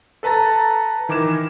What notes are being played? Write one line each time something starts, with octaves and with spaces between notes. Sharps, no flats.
A4 B4 A5 A#5 A6
D#3 E3 A#4 D6 G#6 E7